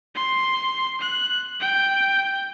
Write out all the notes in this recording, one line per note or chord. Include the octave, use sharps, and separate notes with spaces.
C6
F#6
G5